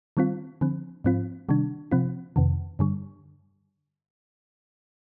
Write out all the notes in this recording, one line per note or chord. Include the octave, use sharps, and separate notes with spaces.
D#3 G3 C4 F4
D3 F3 C4
G#2 F3 C4 F4
C3 D#3 G3 D4
C3 F3 C4 F4
F2 C3 D#3
G2 D3 G3